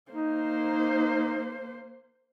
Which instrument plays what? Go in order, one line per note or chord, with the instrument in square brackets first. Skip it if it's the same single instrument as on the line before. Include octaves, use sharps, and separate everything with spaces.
[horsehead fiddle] A#3 C5 [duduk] D#4